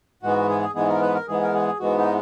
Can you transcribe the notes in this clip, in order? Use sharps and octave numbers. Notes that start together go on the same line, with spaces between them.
G#2 E3 G#3 B3 F#4
G#4
G#2 E3 G#3 B3 G#4
A#4
B4
A#4
G#2 E3 G#3 B3 G#4
A#4
G#4
G#2 E3 G#3 B3 F#4
D#4